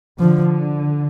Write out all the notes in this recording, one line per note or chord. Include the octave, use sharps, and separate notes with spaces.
D3 F3